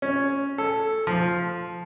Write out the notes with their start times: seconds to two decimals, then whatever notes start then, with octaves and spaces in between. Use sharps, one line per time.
0.02 C#4
0.58 A4
1.07 F3